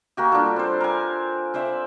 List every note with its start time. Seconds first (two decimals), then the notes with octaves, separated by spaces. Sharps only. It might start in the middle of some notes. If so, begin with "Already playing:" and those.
0.17 A#3 F#4 G4
0.32 G3 D4 F4 A4
0.56 C4 C5
0.80 A#4 G#5
1.54 C4 C5 D5 E5